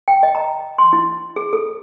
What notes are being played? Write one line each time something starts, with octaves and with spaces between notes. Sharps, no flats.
G5
D#5
A#5
C6
E4
G#4
A4